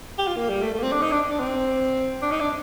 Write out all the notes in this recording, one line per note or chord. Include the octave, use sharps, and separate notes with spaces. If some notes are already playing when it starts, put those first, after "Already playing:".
G4
F4
A#3
G3
A3
A3
A#3
C4
D4
D#4
D4
D4
C4
D4
D#4
D4